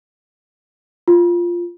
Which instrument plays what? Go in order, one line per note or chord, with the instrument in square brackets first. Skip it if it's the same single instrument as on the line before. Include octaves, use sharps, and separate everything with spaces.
[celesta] F4